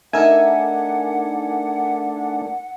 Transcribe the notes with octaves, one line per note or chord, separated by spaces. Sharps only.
A3 D4 D#4 A#4 E5 F#5 G#5